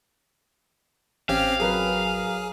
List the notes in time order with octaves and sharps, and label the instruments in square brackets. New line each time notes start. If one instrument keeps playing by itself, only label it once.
[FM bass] A1 [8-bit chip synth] C4 C#4 G4 [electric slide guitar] F5
[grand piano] F#3 A#4 B4 [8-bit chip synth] G#4